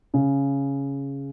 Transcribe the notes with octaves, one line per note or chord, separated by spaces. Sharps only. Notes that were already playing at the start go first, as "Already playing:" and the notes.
C#3